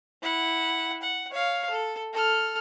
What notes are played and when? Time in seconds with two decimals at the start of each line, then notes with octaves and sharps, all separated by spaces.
0.22 E4 F#5
1.02 F#5
1.31 C#5 F5
1.70 A4
2.13 A4 F6